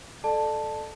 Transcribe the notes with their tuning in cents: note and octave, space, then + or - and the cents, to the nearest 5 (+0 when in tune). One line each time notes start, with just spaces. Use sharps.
A4 -10 D5 +35 A5 +0